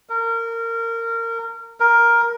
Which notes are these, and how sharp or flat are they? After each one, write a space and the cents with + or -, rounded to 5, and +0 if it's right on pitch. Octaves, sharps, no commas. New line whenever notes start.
A#4 -25
A#4 +10